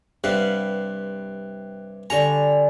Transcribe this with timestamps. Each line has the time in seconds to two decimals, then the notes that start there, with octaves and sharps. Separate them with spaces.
0.24 G2 C3 B4 F5 F#5 F#6
2.10 D3 G3 G#5 A#5 C#6